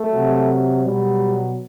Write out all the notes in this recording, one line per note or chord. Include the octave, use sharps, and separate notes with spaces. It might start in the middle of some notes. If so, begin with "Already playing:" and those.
Already playing: A3
C3 F#3
B2 F#3 G3